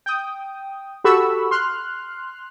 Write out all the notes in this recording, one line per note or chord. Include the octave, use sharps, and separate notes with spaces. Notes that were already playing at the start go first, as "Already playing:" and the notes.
G5 D#6
F#4 G4 A4 B5 C#6 E6
C6 F6 F#6